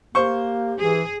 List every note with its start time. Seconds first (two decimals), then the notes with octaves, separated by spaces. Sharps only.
0.15 A#3 G4 C5 C#6
0.79 E3 G#4